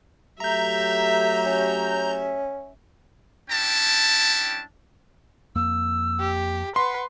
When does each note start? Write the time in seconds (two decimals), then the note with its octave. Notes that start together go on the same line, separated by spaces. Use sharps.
0.40 F#3 A3 G4 E5 A#5 G6
1.46 C#4
3.50 G3 C#4 D4 E4 G5 A5
5.56 F2 A#3 E6
6.20 G4
6.76 B4 F#5 C6